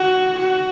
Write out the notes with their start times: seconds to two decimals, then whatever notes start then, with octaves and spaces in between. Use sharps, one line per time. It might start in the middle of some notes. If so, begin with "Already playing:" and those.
Already playing: F#4
0.39 F#4